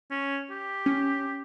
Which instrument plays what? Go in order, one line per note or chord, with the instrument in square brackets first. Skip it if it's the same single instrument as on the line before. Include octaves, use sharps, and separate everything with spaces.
[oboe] C#4
G4
[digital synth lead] C#4